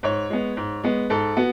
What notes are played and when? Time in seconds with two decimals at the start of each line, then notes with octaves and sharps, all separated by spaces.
0.03 G#2 C#5
0.30 G#3 B3
0.57 G#2
0.84 G#3 B3
1.10 G#2 A4
1.37 B3 F#4